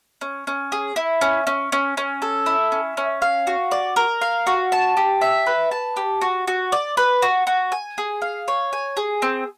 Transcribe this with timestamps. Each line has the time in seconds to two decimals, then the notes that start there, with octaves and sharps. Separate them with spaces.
0.21 C#4
0.47 C#4
0.72 G#4
0.96 E4
1.21 C#4
1.47 C#4
1.72 C#4
1.97 C#4
2.22 A4
2.46 E4
2.72 C#4
2.97 C#4
3.22 F5
3.47 F#4
3.71 D5
3.96 A#4
4.21 F5
4.47 F#4
4.72 A5
4.97 G4
5.21 E5
5.46 B4
5.71 A5
5.97 G4
6.21 F#4
6.48 F#4
6.72 D5
6.97 B4
7.22 F#4
7.47 F#4
7.72 G#5
7.98 G#4
8.22 F5
8.48 C#5
8.73 G#5
8.97 G#4
9.22 C4